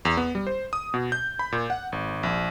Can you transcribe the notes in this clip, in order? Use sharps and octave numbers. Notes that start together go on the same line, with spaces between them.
E2
B3
G3
C5
D#6
B2
G6
B5
A#2
F#5
G#1
A#1